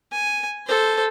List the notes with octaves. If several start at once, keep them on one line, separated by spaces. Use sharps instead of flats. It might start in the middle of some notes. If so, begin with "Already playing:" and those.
G#5
A4 C5